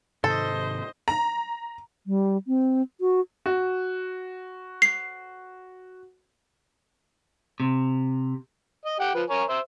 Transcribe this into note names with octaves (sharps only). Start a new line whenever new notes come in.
G#2 C3 D#3 A4 C5 D#5
A#5
G3
C4
F#4
F#4
C7
C3
D#5
G4 F#5 G5
F3 B4
A#4 C#5 G#5
C5 E5